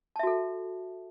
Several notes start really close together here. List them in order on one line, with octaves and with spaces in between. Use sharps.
A5 E5 F#4 A4